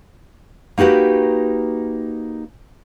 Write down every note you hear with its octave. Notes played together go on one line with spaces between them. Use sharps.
A#3 D#4 F#4 G4 B4